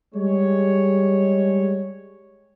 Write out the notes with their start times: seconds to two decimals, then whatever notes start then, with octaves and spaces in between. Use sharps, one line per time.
0.14 G3 G#3 C#5